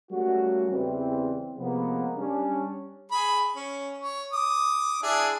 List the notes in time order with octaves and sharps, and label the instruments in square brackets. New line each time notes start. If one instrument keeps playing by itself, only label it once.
[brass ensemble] G3 A3 A#3 C#4 F#4
E2 C#3 E3 G3 C4
C3 F3 G#3 A#3 B3
G3 C#4 D4
[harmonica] G#4 B5
C#4
C#5
D6 D#6
D4 E4 G#4